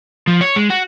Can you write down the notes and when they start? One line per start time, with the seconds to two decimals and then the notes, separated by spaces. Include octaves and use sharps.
0.28 F3
0.41 C#5
0.56 G#3
0.70 F#4